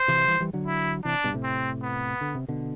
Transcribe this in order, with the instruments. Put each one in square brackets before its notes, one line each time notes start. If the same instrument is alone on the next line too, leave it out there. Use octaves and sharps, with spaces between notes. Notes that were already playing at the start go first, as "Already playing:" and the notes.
Already playing: [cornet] C5
[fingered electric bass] C3 E3
E3 G3
E3 G3
D3 F#3
[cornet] E4
[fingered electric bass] C3 E3 [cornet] D4
[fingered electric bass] G2 B2
A2 C3
[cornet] C4
B3
[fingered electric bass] D3
C3
B2 D3